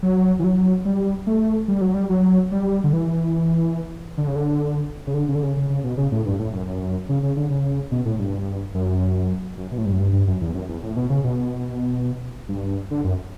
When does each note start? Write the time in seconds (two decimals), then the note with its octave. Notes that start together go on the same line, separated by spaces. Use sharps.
0.03 F#3
0.39 E3
0.44 F#3
0.85 G3
1.27 A3
1.68 G3
1.81 F#3
1.94 G3
2.09 F#3
2.52 G3
2.84 D3
2.93 E3
4.18 D3
4.27 C#3
4.36 D3
5.07 C#3
5.14 D3
5.29 C#3
5.35 D3
5.43 C#3
5.57 C#3
5.70 C#3
5.84 B2
5.97 C#3
6.12 A2
6.26 G2
6.39 A2
6.53 F#2
6.67 F#2
7.09 C#3
7.23 C#3
7.37 D3
7.50 C#3
7.92 B2
8.06 A2
8.19 G2
8.74 F#2
9.58 F#2
9.72 B2
9.78 A2
9.85 G2
9.93 F#2
9.99 G2
10.13 G2
10.27 F#2
10.41 E2
10.55 F#2
10.69 E2
10.83 A2
10.96 B2
11.10 C#3
11.24 B2
12.49 G2
12.91 D3
13.04 F#2